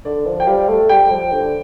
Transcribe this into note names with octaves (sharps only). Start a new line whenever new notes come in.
D3 D5
F3
G5
G3 F5
A3
G3 G5
F3
D3